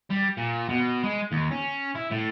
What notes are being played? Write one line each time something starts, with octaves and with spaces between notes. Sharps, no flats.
G3
A#2
B2
G#3
D#2
C#4
E4
A2